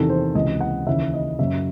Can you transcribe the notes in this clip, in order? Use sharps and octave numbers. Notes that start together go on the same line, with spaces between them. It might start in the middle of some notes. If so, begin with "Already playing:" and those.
Already playing: E2 C3 D#3 A4
C5
C#2 C3 E3 D#5
F#5
D#2 C#3 E3 E5
D#5
F#2 C#3 F#3 E5